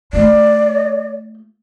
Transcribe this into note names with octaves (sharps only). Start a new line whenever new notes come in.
A3 F4 D5